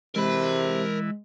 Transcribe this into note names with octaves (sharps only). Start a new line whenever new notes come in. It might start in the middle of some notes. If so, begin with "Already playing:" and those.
C3 E3 G#3 A#4 B5